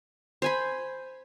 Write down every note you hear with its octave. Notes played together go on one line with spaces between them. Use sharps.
C5 G#5 B5